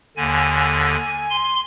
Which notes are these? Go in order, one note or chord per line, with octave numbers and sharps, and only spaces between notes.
D#2 D3 G#5
C6